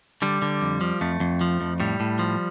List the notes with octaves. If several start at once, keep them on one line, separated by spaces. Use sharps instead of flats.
D3 G3
D3
F2
F3
F2 A3
F2
F3
F2
A2 G3
A2
F3